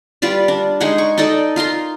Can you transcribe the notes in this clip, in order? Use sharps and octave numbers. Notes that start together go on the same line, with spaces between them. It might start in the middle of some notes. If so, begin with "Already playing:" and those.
G3 F4 B4 D5
D4
G#3 D#4 G#4 F#5
C#6
D#4 A4 D5 D#5
F4 A#4 A#5 C6